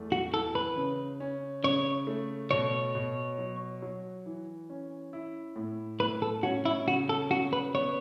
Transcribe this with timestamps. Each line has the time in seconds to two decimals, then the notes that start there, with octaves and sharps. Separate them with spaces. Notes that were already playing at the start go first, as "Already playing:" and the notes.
Already playing: E2 A3
0.12 F#4
0.33 E3 A4
0.55 B4
0.77 C#3
1.20 C#4
1.63 C#3 C#5
2.07 A3
2.51 B2 C#5
2.95 B2
3.38 F#3
3.82 F#3
4.26 E3
4.70 C#4
5.13 E4
5.56 A2
6.00 A2 B4
6.22 A4
6.43 C#4 F#4
6.65 E4
6.88 C#3 F#4
7.09 A4
7.31 C#3 F#4
7.53 B4
7.75 B3 C#5